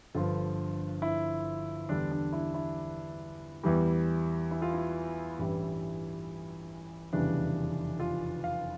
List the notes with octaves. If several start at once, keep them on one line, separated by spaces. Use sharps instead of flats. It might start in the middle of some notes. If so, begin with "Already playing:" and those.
G1 G2 D3 F3 F4
E4
E2 D3 G3 D4
D4
E4
E4
E2 E3 G3
E4
F4
E4
A1 G2 E3 G3
F1 E2 C#3 E3 G3 D4
F4
F5